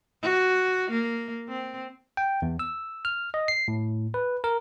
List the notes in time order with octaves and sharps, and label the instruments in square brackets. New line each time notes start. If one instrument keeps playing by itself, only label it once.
[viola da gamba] F#4
A#3
C4
[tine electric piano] G5
E2
E6
F6
D#5
C7
A2
B4
A#4